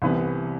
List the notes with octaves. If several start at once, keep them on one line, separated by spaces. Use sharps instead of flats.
C2 C3 E3 B3